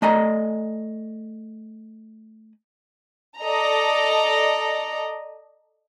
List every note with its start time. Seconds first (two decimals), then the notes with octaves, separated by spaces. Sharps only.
0.02 A3 D5 D#5 G#5 A#5
3.40 A4 D5 D#5 A#5